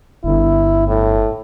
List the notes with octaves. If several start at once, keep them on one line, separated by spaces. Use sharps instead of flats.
G1 E4
A2